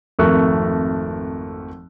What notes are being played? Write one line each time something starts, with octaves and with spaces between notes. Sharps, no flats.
G#1 F2 A3 A#4 C#6 F#6